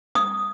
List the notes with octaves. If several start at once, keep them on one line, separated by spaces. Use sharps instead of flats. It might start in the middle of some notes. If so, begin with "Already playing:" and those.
D#6